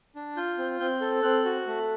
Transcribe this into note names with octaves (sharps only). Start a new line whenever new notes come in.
D4
F4 G6
C4
C4 G6
A4
C4 F#6
F#4
A3